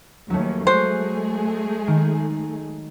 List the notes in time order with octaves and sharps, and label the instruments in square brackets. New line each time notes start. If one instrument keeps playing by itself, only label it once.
[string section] D#2 C#4 [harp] F#3 A3
[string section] G#3 A3 G#4 [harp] F#4 C#5 [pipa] C5
[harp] D#3